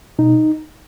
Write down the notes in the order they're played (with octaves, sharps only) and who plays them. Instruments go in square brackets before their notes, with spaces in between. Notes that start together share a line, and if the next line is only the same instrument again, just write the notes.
[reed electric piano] B2 D#4